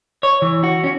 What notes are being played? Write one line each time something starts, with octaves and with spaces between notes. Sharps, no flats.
C#5
E3
F#4
C#4